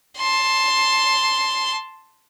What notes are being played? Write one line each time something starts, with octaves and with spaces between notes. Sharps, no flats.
A5 C6